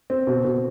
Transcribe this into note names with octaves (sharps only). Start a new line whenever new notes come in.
C4
B2
B2